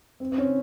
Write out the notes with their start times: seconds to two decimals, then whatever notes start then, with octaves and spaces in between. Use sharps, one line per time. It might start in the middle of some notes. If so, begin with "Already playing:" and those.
0.20 C4
0.32 C4
0.38 C#4